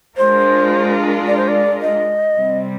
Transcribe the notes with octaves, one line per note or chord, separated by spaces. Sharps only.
G#3 D4 F4 A#4 C5
D5
C5
D5
D#5
C3 G3 C4